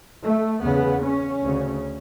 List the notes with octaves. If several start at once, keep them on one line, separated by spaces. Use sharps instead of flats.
A3
E2 C#3 B3
C#4
D2
C#3